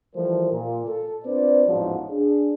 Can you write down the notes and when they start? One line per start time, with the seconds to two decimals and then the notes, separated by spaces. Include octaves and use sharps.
0.15 E3 F3 G3 A3 A#4 C5
0.52 A#2
0.86 A4
1.24 C4 D4 F4 B4 C5 D5
1.67 A1 E2 G#2 F3 F#3
2.10 D4 G#4